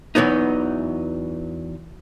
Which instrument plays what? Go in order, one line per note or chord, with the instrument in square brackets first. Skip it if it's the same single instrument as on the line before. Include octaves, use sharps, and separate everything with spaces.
[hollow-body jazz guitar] E2 E3 F#3 B3 D#4